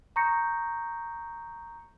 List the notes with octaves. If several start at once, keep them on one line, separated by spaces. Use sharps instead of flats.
A#5 C#6 D#6 G6 A#6 C#7